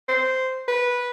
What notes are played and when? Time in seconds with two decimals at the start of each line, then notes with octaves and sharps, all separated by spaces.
0.08 C5
0.68 B4